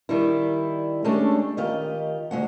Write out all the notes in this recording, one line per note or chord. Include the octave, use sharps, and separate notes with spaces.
D#3 G3 E4
G#3 A3 C#4 D4 G4 A4
D#3 F4 G4 D#5
D2 B2 G#3 F#5